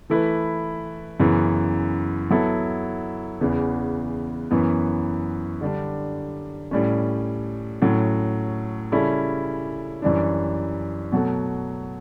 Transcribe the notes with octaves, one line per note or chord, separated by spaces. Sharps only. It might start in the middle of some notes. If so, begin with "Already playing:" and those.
E3 A3 E4 B4
F#2 C#3 E3 B3
F#3 B3 E4 A4
E2 C#3 E3 B3
F#2 E3 B3
D3 G3 D4
A2 G3 C#4
A2 F#3 C#4
C#3 G3 C#4 E4 A4
F#2 E3 G3 D4
B2 F#3 A3